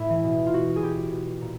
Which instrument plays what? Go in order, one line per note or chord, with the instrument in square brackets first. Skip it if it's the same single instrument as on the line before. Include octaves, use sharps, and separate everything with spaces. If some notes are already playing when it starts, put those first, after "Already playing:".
Already playing: [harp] A2 E4
E3
B2
F4
B2 F#4
G#4
B2 G4
B2
A#2